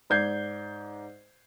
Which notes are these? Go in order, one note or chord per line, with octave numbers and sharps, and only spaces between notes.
G#2 D5 G6 G#6 C7